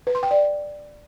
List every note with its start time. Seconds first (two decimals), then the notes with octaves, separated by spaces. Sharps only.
0.07 B4
0.15 C6
0.23 G5
0.31 D5